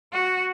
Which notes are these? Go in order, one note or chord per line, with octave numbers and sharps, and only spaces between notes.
F#4